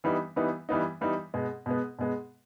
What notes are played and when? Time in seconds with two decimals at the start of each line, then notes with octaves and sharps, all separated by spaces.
0.04 E3 G3 B3 D#4
0.36 E3 G3 B3 D#4
0.69 E3 G3 B3 D#4
1.01 E3 G3 B3 D#4
1.34 B2 G#3 B3
1.66 B2 G#3 B3
1.99 B2 G#3 B3